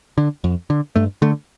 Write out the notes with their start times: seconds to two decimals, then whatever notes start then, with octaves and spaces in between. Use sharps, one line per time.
0.18 D3
0.44 F2
0.70 D3
0.96 G2 A3
1.22 D3 A3